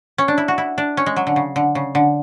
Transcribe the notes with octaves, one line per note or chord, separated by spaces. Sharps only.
C#4
D4
E4
F#4
E4
D4
C#4
G#3
F#3
D3
C#3
D3
C#3
D3